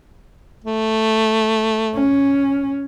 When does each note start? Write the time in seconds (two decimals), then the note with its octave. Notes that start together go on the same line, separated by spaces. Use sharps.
0.64 A3
1.94 C#4